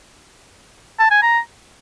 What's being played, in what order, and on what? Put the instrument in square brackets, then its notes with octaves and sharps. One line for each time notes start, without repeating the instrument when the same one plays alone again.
[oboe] A5
G#5
A#5